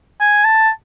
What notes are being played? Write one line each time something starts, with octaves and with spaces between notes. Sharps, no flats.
G#5
A5